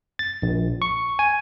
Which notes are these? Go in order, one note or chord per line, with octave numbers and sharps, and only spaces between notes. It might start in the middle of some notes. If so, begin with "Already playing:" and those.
A6
A#1
C#6
G#5